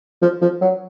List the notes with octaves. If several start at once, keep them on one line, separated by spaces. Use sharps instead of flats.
F3
F3
F#3